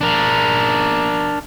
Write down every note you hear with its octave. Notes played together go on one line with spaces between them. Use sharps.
D4 A#4